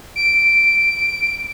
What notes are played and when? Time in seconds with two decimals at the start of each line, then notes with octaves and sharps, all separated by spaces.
0.16 D7